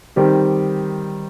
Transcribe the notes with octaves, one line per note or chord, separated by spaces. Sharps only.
D#3 G3 C4 G4